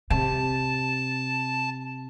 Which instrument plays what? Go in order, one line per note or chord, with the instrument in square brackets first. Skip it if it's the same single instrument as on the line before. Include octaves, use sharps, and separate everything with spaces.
[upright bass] C3 [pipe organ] A5